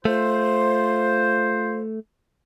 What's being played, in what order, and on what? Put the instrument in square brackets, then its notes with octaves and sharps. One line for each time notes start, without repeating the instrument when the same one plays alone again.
[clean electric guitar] A3 [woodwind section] F4 C5